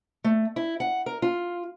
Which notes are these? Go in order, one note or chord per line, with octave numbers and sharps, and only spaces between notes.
A3
E4
F#5
A#4
F4